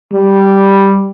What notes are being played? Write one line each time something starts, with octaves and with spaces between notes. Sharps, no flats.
G3